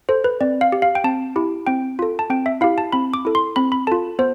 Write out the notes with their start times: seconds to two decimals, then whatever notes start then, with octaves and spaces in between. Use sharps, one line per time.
0.09 A4 C5
0.24 B4
0.41 C4 D5
0.61 F5
0.72 G4
0.82 F5
0.95 G5
1.04 C4 A5
1.36 E4 G4
1.67 C4 G5
1.99 F4 A4
2.19 A5
2.30 C4 G5
2.46 E5
2.61 E4 G4 F5
2.78 A5
2.92 C4 B5
3.14 D6
3.25 E4 A4
3.35 C6
3.56 C4 B5
3.72 B5
3.87 F4 A4 A5
4.19 B3 C5